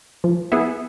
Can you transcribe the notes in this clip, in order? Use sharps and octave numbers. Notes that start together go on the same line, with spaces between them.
F3
B3 E4 G#4